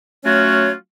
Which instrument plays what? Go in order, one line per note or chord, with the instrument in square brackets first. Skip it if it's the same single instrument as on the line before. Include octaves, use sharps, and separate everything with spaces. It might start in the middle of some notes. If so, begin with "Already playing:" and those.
[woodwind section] F#3 A3 C#4 F4 F#4 C#5